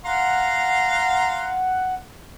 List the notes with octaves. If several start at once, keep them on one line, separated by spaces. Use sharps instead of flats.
F5 F#5 A#5 C6